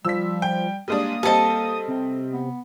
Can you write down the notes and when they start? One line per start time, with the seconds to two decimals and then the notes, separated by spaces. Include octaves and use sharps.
0.05 F3 G3 E6 B6
0.42 G5
0.88 G3 G#3 A#3 D4 D#6
1.23 G3 C4 A4 D#5 A5
1.88 C3
2.33 B3